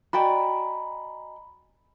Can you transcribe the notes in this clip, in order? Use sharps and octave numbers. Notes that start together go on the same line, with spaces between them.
F#4 D5 D#5 G5 G#5 A#5 B5